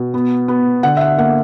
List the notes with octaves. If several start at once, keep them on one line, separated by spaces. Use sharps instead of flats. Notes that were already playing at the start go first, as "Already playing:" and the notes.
Already playing: B2
B3
B3
D3 F#5
E5
F#5
A#3 F#5